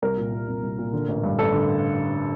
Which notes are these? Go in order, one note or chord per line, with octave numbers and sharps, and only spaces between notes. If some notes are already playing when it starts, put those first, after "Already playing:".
C2 A#4
A#2
A#2
C2
C2
A#2
D3
A1
G2
A1 A4
D3